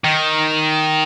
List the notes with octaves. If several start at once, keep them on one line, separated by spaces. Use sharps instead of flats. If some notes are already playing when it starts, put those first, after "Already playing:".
D#3